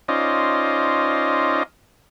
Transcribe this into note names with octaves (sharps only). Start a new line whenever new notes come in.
C#4 D#4 F4 C5 D5 D#5